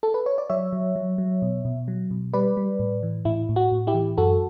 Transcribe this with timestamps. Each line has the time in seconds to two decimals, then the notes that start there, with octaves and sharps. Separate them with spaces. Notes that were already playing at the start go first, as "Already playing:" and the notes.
0.03 A4
0.14 B4
0.26 C#5
0.38 D5
0.50 F#3 C#5 E5
0.73 F#3
0.96 F#3
1.18 F#3
1.42 B2
1.65 B2
1.88 F#3
2.11 B2
2.33 G3 B4 D5
2.57 G3
2.79 A2
3.03 E3
3.25 A2 E4
3.49 A2
3.56 F#4
3.72 A2
3.87 E4 G4
3.94 E3
4.18 F#2 F#4 A4